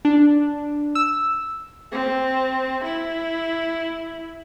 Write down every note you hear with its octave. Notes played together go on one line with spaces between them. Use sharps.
D4
E6
C4
E4